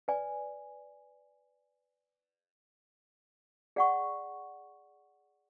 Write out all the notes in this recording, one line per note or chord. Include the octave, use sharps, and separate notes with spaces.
B4 D5 G#5
G#4 D5 F#5 C#6